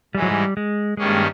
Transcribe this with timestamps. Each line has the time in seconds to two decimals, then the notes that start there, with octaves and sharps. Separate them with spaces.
0.14 G#2 E3 G3 G#3
0.22 F#3
0.31 G3
0.57 G#3
0.97 G2 D#3 G3 G#3 A#3 C#4